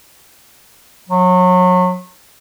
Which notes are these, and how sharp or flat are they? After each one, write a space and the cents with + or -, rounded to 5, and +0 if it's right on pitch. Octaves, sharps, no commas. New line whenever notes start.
F#3 -30